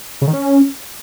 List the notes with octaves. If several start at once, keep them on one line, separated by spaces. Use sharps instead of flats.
C#3
D#3
C#4